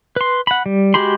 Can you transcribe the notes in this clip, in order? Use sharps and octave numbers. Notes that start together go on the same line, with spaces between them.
B4 C6
F#5 B5
G3
G#3 F#4 G4 B5 C6